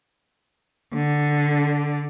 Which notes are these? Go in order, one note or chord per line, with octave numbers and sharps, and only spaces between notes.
D3